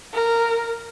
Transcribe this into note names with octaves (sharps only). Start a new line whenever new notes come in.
A#4